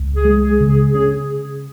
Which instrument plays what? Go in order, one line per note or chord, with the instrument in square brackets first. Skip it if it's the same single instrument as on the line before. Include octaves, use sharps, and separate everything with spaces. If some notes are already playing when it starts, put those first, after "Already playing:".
Already playing: [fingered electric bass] C#2
[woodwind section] G#4
[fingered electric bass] G#3
[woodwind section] G#4
[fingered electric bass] C#3
[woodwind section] G#4
[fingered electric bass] C#4 [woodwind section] G#4